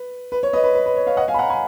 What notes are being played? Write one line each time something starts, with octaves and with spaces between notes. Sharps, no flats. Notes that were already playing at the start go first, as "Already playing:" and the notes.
Already playing: B4
B4
C#5
B4 D#5
B4
B4
B4
C#5
C#5 F5
D#5 F#5
F5 G#5
B5
F#5 A#5
G#5 B5